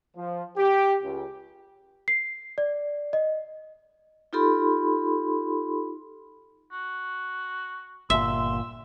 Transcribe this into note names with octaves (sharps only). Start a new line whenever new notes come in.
F3
G4
C#2
C7
D5
D#5
D#4 F4 G4 A4 B5 C6
F#4
G1 A#2 E5 C6 E6